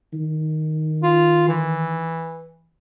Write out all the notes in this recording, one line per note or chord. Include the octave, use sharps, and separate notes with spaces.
D#3
F4
E3